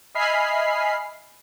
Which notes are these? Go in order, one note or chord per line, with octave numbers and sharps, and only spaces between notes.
D#5 E5 G#5 B5 F6 C7